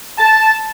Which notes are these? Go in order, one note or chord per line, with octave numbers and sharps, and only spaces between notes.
A5